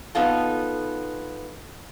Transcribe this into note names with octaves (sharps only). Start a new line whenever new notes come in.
B3 D#4 F4 A4